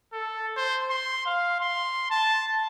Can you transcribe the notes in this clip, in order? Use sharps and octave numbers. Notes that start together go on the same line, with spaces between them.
A4
C5
C6
F5
C6
A5